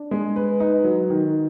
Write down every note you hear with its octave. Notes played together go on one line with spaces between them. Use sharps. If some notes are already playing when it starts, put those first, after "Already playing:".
Already playing: D4
G#3
B4
D#4
F#3
D#3